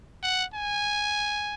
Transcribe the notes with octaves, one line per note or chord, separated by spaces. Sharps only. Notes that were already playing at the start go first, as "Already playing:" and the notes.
F#5
G#5